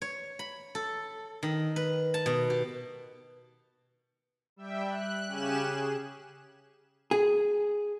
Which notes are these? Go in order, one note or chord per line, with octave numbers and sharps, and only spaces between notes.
C#5
B5
A4
D#3
B4
A5
B2
G4
G3 E5 G5
F#6
C#3 C#4 G4 G#5 F#6 E7
G#4
G#4